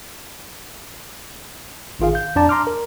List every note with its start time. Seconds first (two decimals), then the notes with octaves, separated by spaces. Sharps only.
2.00 G#1 D#3 F4 G#4 F5
2.14 F5 G6
2.36 F2 D4 D5 A5 A#5
2.49 A#5 C6 D6 F6
2.67 A#4